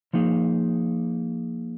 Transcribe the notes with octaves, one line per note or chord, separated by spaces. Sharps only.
F3 A#3 D#4 G#4